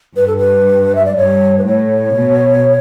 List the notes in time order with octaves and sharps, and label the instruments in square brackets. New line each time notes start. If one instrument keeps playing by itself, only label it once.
[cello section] G2 [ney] B4
[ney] A4
B4
E5
D5
[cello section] G2 [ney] C#5
[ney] B4
[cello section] A2 [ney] C#5
[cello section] B2